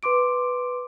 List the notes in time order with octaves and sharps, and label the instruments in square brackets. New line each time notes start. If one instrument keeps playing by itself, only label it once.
[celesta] B4 C6 D6 D7